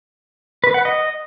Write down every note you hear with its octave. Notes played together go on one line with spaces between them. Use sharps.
B4
F#5
D#5